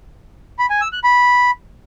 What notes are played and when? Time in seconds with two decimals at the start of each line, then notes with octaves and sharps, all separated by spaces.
0.59 B5
0.70 G#5
0.81 E6
0.93 F#6
1.04 B5